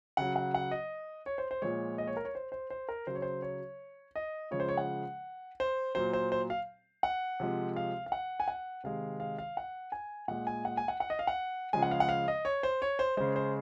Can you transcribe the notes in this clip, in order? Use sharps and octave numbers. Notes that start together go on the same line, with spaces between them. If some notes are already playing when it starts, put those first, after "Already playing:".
C#3 F#3 F#5
F#5
F#5
D#5
C#5
C5
C5
A#2 F3 G#3 C#5
D#5
C#5
A#4
C#5
C5
C5
C5
A#4
C#3 F#3 C5
C#5
C5
C#5
D#5
C#3 F3 G#3 C#5
C5
C#5
F#5
C5
A#2 F#3 C5
C5
C5
F5
F#5
C3 F3 G#3
F5
F5
F#5
G#5
F#5
C3 D#3 G#3 F5
F5
F5
F#5
G#5
A#2 G#3 F#5
G#5
F#5
G#5
F#5
F#5
D#5
F5
F#5
C#3 F3 G#3 G#5
F#5
F5
F#5
F5
D#5
C#5
C5
C#5
C5
C#3 G#3 C5
C5